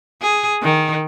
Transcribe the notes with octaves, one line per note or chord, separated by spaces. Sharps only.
G#4
D#3